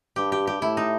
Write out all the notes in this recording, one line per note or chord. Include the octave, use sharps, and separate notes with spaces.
G2 G4
G4
G4
A2 E4
D#4